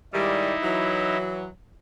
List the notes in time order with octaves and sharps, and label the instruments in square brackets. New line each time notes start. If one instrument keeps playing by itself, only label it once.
[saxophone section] G#2 D#3 G3 [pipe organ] D#4 E4
[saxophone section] E3 F#3